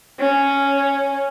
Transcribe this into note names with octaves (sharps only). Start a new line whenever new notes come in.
C#4